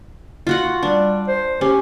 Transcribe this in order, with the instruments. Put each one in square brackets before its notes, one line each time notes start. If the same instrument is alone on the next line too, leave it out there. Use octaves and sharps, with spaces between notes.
[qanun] F4 F#4 F#5
[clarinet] G3 [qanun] D4
[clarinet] C5
[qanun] C#4 [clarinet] G4